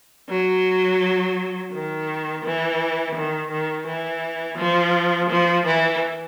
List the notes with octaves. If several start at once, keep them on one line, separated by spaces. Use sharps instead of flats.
F#3
D#3
E3
D#3
D#3
E3
F3
F3
E3